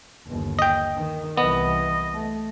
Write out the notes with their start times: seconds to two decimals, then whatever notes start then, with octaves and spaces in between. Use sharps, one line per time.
0.24 G1 D#2
0.59 D#5 G5
0.96 D#3
1.37 C2 E3 B3 D#5
2.13 A3